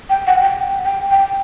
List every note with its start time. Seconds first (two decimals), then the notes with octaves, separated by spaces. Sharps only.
0.10 G5
0.27 F#5
0.42 G5
0.85 G5
1.10 G5